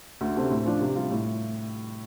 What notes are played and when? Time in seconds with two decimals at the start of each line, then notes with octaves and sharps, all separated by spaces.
0.21 D2
0.36 C3 A3 C4
0.50 A2
0.66 F3 D4
0.80 C3
0.95 G3 F4
1.11 A2